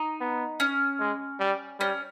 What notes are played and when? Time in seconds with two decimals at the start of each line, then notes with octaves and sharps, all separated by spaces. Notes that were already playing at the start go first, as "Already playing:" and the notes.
Already playing: D#4
0.21 B3
0.60 C#4
1.00 G#3
1.40 G3
1.80 G3 C#4